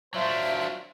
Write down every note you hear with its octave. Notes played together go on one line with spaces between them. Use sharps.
F#3 D4 F4 C5 E5